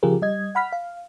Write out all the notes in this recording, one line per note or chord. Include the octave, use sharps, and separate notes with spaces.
C#3 F3 F4 G4 G#4 A#4
G3 D#5 G#6
F#5 B5 F6 B6
F5